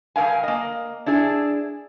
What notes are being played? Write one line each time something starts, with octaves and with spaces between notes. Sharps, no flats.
G2 D#3 A#4 F5 G#5
A#3 D#5
D4 E4 G#4